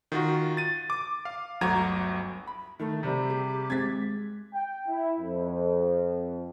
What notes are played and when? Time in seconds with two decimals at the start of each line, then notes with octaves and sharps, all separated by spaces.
0.12 D#3 F4 F#4
0.57 A6 D#7
0.90 D6
1.25 F5
1.61 G1 D2 F#3 F#4 A#5 G#6
2.47 B5
2.80 D#3 A3
3.03 C3 G3 G4
3.30 G#4
3.70 G#3 C4 G#6 A6 B6
4.54 G5
4.87 E4
5.20 F2